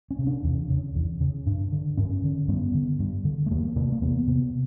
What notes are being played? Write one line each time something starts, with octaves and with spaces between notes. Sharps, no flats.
C#4
C3
D4
E2
C#3
E2
C#3
G2 D4
D3
G2 C#4
D3
G2 B3
D3
G2
D3
A3
E2 A#3
C3 A#3
A#3
E2 B3
C3